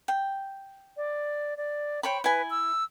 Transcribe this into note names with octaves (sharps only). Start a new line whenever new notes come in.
G5
D5
D5
C5 C#5 G5 B5
E4 B4 G#5
E6